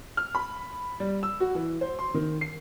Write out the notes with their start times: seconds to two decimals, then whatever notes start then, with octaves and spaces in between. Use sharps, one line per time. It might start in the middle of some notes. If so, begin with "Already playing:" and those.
0.17 F6
0.35 B5
1.00 G3
1.23 E6
1.40 F#4
1.55 E3
1.81 C5
1.99 C6
2.14 D#3
2.41 C7